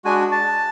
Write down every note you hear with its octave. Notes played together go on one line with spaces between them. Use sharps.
G#3 D4 F#4 G#5
A5